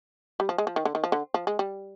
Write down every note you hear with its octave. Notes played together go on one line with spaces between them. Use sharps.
G3
F3
G#3
F3
D#3
D3
D#3
F3
D3
F3
G#3
G3